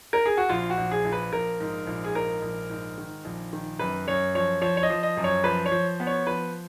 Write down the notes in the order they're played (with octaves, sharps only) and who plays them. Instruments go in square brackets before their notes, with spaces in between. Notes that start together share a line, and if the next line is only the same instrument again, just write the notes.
[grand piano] A#4
G#4
F#4
A#1 F4
F#4
A#1
G#4
A#1
B4
A#1 A#4
G#2
A#1
G#4
G#2 A#4
A#1
G#2
D#3
A#1
D#3
F#2 B4
F#2 C#5
F3 C#5
F3 C#5
C#5
D#5
F3
D#5
F#2
C#5
F3 B4
C#5
F3
B3
C#5
F3 B4